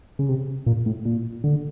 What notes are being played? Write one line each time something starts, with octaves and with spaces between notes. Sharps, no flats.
C#3
C3
A#2
A2
A#2
D3